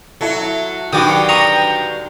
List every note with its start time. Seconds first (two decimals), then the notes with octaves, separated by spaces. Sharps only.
0.21 F#3 E4 A4
0.93 G2 D3 D#3 F#3 F#4 G5 D6 D#6
1.29 A#5 C#6 D#6